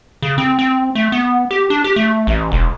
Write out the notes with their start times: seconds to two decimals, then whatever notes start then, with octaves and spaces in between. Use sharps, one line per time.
0.22 C#3
0.38 C4
0.59 C4
0.95 A3
1.12 B3
1.51 G4
1.70 D4
1.84 G4
1.96 A3
2.27 A1
2.51 E1